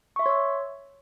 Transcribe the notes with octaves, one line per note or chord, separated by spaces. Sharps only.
C#5 E5 C6 C#6 E6